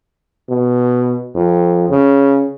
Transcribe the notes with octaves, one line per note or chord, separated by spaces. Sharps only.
B2
F2
C#3